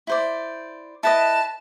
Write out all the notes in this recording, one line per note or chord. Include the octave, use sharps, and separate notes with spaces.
E4 C5 D5
E4 B4 D#5 A5